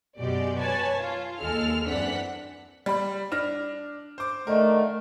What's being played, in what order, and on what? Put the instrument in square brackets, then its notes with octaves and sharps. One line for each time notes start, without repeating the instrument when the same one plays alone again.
[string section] F#2 B2 G#3 G4 D5
B4 C#5 G#5 A5
F4
D#2 G#3 A4 F6
F#2 E3 C4 D4 F#5 B6
[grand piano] G3 B5
D4 F6 A#6
C5 D6
[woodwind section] D3 D#3 A3 [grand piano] A#4